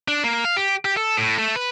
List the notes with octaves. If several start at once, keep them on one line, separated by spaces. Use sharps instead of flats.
D4
A#3
F5
G4
G4
A4
A2
A3
B4